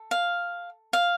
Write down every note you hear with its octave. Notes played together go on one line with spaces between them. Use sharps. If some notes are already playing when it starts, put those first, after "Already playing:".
Already playing: A4
F5
F5